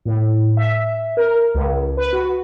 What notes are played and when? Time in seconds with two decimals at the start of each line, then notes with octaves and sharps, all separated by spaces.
0.05 A2
0.57 E5
1.17 A#4
1.54 C#2
1.97 B4
2.13 F#4